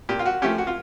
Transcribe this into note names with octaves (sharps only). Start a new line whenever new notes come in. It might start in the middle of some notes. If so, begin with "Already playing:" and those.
A#2 G4
F4
F#4
F3 A3 C#4 G4
F#4
F4